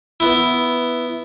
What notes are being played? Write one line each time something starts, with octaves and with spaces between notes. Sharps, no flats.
B3 E4